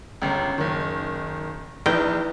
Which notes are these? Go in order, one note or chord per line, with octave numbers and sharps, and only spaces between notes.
G1 C#2
F#1 D#3
A#1 E3 D#4 G5